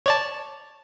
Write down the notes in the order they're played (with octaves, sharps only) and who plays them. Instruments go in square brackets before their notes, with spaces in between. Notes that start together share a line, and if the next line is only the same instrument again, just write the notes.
[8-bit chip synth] C#5 D5 A5